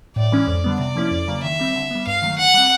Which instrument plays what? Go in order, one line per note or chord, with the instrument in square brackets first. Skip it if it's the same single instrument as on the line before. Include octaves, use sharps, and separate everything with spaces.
[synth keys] A2 [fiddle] D5
[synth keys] E3 G#3 C#4
F2
D3 G3 B3
[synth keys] C3 [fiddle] D5
[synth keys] F3 A#3 C#4 E4
F2
C#3 F#3 A#3
[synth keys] D#3 [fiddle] E5
[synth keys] G3 C4
D3
G3 B3
[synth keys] G2 [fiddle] F5
[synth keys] D#3 F#3 A3
[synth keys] D3 [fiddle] F#5
[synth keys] G3 C4